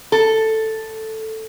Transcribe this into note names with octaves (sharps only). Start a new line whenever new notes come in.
A4